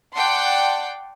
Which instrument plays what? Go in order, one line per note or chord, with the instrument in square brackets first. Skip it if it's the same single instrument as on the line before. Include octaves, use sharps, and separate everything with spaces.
[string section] D5 F#5 G5 A5 C6